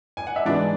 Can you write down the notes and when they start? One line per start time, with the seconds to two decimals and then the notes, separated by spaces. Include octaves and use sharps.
0.17 G#5
0.27 F#5
0.36 E5
0.45 G#2 E3 B3 D4 D5